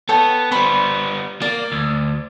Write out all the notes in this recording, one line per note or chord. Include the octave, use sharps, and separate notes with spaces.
B3 A4 C#5 G5
G3 B3 C5 B5 C#6
A#3 D5
D2